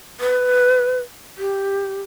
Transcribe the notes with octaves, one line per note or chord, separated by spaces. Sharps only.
B4
G4